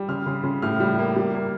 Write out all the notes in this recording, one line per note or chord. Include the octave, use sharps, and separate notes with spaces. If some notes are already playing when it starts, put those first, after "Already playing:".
Already playing: G3
C#3 F6
C#3
C#3
A2 F6
G3
A#3
G3
A#3